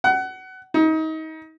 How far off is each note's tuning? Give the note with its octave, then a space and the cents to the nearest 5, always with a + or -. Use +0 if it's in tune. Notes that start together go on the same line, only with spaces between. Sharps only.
F#5 +25
D#4 +30